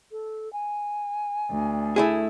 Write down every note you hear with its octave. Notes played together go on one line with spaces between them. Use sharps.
A4
G#5
D2
A3 E4 G#4